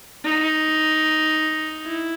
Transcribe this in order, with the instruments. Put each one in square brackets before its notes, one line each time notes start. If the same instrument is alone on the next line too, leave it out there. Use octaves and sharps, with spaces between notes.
[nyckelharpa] D#4
E4